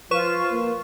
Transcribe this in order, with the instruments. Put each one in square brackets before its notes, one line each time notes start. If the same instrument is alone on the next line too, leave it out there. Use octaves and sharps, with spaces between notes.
[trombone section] F3 [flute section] F4 [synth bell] B4 C#6 E7
[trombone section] A#3